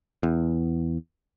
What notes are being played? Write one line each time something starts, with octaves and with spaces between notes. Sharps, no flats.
E2